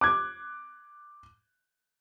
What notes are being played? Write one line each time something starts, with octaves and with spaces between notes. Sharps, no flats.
D6 F#6 G#6